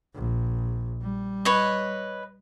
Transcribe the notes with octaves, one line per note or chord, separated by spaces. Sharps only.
A#1
G3
B4 C#5 D#5